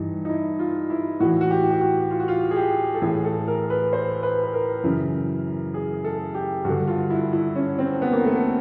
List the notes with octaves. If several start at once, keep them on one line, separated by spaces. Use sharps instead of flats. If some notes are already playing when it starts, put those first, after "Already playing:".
Already playing: G2 E3 D#4
D#4
E4
F4
E4
A2 E3 F#4
F#4
G4
G4
F#4
F4
F#4
F4
G#4
G4
A4
A2 E3 G#4
A4
A#4
B4
C5
B4
B4
A#4
F#2 C#3 E3
G#4
A4
G4
G2 D3 F#4
F4
E4
E4
C#4
C4
B3
A#3
A3